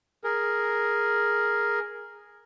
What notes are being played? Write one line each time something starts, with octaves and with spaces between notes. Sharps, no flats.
G#4 A#4